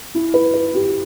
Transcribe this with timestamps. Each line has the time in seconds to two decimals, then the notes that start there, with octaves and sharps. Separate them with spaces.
0.15 E4
0.34 B4
0.54 B4
0.74 G4